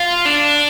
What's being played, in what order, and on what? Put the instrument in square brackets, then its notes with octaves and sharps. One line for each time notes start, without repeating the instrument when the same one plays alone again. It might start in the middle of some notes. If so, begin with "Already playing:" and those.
Already playing: [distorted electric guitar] F4
D4